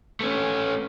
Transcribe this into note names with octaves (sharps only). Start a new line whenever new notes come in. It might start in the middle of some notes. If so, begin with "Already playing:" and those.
A3 C#4